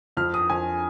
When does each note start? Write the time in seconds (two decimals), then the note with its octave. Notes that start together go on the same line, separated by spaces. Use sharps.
0.17 F2 F6
0.34 D#6
0.50 F2 G#5